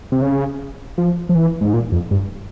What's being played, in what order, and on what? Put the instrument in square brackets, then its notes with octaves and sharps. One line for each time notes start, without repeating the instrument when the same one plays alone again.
[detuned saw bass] C3
C#3
F3
F3
E3
G#2
A#2
F2
G2